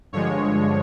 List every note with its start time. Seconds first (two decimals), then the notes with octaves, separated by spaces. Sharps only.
0.13 G2 D3 F3 G#3 C#5